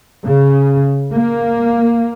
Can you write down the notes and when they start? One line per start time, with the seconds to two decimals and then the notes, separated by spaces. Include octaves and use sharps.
0.25 C#3
1.13 A#3